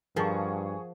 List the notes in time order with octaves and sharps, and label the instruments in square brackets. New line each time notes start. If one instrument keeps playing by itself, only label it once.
[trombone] G2 [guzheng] F3 [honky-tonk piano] G#4 F#5 C#6 [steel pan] A#4 A5